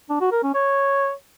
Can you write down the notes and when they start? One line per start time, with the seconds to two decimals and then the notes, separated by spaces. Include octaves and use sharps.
0.10 D4
0.21 F#4
0.32 A#4
0.43 C#4
0.54 C#5